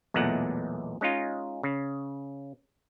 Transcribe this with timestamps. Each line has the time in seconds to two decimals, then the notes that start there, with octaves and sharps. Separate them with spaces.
0.14 B1 E2 A#2 G#3 A3 F#5
1.01 G#3 C#4 D#4 F4
1.63 C#3